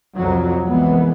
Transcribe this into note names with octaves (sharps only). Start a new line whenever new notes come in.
C2 F2 F3 F#3
C2 E3 G#3 B3